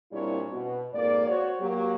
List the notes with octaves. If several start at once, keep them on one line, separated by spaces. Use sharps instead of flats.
A#2 G3 C4 D4 E4 C#5
B2
F2 G#2 A#3 D5
F#4 C5 C#5
F#3 A#3 G4